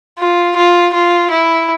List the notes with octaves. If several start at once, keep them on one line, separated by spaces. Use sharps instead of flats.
F4
F4
F4
E4